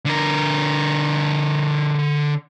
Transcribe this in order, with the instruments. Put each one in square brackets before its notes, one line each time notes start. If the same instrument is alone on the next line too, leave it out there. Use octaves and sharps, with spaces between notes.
[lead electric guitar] D3 A#4